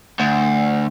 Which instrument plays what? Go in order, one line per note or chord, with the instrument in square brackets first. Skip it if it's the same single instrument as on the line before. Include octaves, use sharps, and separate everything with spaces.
[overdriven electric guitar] D2